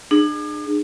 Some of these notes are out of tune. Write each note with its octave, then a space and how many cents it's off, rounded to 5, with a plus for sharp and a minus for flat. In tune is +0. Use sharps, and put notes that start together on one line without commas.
D4 +40 G#4 +0